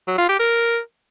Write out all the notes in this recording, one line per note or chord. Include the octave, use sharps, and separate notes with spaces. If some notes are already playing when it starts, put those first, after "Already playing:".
F#3
F4
G4
A#4